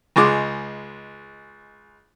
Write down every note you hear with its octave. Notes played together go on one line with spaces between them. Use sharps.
C#2 G#3 D6